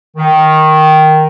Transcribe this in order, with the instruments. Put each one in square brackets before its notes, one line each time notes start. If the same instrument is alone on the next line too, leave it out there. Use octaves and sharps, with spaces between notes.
[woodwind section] D#3